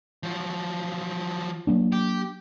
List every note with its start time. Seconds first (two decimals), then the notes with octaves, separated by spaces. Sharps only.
0.23 F3 F#3
1.67 F#3 A#3 D4
1.92 G4